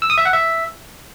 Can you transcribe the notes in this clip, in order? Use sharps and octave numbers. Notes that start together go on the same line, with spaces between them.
E6
D#6
E5
F#5
E5